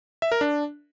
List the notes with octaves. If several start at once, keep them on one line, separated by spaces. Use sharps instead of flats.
E5
A#4
D4